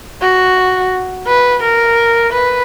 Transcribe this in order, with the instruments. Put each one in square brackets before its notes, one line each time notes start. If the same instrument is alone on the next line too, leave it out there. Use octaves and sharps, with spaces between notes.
[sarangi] F#4
B4
A#4
B4